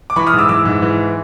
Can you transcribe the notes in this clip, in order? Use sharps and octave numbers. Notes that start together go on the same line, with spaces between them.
D6
E3 B5 C#6
D#6 F6
G#2
D6 E6
E3 D6 E6
G#2
E3